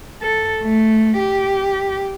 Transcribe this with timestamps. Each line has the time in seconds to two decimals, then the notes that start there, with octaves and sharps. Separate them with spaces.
0.22 A4
0.63 A3
1.19 G4